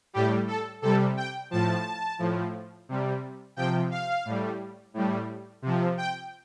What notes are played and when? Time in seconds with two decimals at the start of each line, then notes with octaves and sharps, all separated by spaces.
0.13 A2 G3 G4
0.47 A4
0.82 C3 G3 A4
1.17 G5
1.51 A2 F3 A5
2.19 A2 F3
2.89 C3 G3
3.56 C3 F3 G5
3.91 F5
4.25 A2 G3
4.94 A2 G3
5.62 C3 F3
5.97 G5